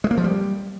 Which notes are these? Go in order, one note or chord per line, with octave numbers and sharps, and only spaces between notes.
G#3
A#3
F3
G3